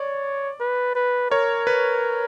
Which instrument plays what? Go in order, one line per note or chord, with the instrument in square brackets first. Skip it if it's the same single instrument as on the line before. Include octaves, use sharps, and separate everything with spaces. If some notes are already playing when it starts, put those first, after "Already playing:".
Already playing: [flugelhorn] C#5 [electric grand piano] D5
[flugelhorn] B4
B4
[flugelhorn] A#4 [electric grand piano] C#5
[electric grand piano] B4